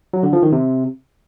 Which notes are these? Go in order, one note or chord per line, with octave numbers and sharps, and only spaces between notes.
F#3
D3
F3
D#3
C3